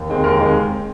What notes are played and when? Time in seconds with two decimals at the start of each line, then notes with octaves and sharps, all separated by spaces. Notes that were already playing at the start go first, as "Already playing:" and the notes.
Already playing: D#2
0.09 D#3 G#3 C4
0.24 D#2 A#4
0.40 D#3 G#3 C4